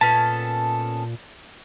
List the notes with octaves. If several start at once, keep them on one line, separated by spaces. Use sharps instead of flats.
A#2 B3 C#4 A4 A5